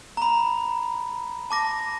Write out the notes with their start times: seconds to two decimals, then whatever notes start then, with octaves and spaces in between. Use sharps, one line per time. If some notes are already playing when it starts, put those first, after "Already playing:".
0.17 A#5 B5
1.50 A5 D6 A#6